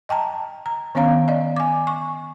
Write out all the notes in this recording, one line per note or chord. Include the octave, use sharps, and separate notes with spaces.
D#5 G5 A5 A#5
A#5
D#3 B3 C#4 C#5 F5 A#5
D5 D#5
G#5 D6
C#6